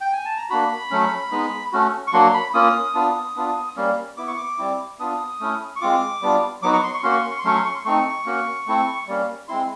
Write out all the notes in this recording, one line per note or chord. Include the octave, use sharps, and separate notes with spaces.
G5
G#5
A5
A#5
A#3 D4 F#4 B5
F#3 A3 C#4
G#3 B3 D#4
A3 C#4 F#4
C#6
F#3 A#3 D4 F#4 C6
B5
A#3 C#4 F4 D#6
B3 D4 F4
B3 D4 F4
G3 A#3 C#4
B3 E4 D6
C#6
D6
G3 C4 E4
B3 D4 F4 D#6
A3 C#4 E4
C#6
G#3 C4 F4 D6
G3 B3 D4 F4
F#3 B3 D#4 F#4 D6
C#6
C6
C#6
A#3 C#4 F#4 C6
C#6
C6
C#6
C6
F#3 A3 C#4 C#6
C6
C#6
C6
A3 C4 D#4 C#6
A#3 C#4 F#4
A3 C4 E4
G3 A#3 C#4
G#3 C4 E4 C6